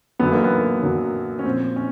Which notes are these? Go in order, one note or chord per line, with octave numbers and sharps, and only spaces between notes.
F#2 D3 F#3 B3
A#3
B3
F#2 D3 F#3
C#4
A#2 F3 C4
C#4